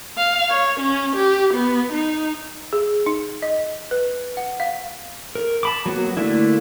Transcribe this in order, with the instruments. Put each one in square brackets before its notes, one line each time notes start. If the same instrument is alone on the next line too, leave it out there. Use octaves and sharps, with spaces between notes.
[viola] F5
C#5
C#4
G4
B3
D#4
[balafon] G#4
D#4
D#5
B4
F#5
F5
[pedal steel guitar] A#4
A5 B5 D6
F#3 A#3 B3 F#4
D3 A3 A#3 D4 E4